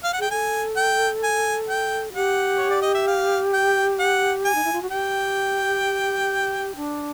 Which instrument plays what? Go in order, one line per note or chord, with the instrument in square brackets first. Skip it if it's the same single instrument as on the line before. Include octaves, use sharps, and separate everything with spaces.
[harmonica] F5
F#5
[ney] G#4 [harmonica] G5
[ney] A4 [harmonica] G#5
[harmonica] G5
G#5
G5
[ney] F#4
[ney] G4 [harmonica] F#5
[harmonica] C#5
D5
D#5
E5
F5
G5
F#5
G#5
[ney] D#4
E4
F4
F#4
[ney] G4 [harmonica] G5
[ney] D4